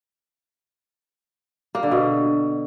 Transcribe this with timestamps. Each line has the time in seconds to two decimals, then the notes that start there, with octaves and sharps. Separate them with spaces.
1.75 A#3
1.83 D3
1.91 B2